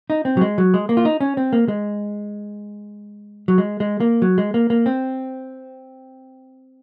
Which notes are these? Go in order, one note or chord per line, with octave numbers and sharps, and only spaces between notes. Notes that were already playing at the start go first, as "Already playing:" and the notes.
D#4
C4
F#3
G#3
F#3
G#3
A#3
F4
D#4
C#4
C4
A#3
G#3
F#3
G#3
G#3
A#3
F#3
G#3
A#3
A#3
C4